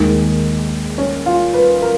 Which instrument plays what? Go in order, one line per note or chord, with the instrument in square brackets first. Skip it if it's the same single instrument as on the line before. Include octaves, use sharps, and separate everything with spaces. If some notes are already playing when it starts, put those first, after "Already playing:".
Already playing: [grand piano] D#2 D#3 G#3 [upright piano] G#4
[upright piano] C#4
F4
B4
A#4